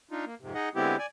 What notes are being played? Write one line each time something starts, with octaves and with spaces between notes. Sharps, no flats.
D4 D#4 F4
A#3
F2 G#2 C3
D#4 G#4 D#5 F#5
D3 G#3 B3 C4 E4 G4
D5 G#5